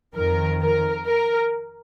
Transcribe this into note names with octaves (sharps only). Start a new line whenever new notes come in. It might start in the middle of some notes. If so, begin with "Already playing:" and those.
F2 D#3 A#4
A#4
A#4